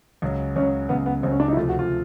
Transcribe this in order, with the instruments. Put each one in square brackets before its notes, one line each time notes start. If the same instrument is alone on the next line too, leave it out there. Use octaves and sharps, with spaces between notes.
[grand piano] C#2 C#3 F#3
[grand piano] C#2 C#3 F#3 [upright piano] C#4
[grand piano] C#2 C#3 F#3 [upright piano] B3
[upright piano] B3
[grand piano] C#2 C#3 F#3 [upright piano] C4
[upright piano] C#4
D4
D#4
E4
[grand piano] D2 C3 F3 A3 [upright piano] F4
[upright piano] F#4
F4